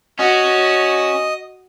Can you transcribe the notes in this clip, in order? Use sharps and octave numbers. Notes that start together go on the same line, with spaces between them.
C#4 F#4 D#5